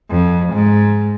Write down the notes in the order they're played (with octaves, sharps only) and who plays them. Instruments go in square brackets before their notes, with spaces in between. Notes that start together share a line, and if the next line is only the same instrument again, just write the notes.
[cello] F2
G#2